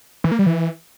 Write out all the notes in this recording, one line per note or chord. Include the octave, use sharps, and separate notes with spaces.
E3
A#3
G3
E3